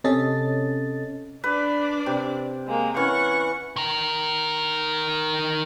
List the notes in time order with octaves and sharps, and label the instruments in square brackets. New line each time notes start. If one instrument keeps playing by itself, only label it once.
[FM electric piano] C3 C#4 A4 D#5 A6
[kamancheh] D4 D5 [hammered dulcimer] B4
[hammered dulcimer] C3
[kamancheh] G#3 A#3
[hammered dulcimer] E3 C#4 [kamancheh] F#5 C#6
[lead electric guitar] D#3 A#4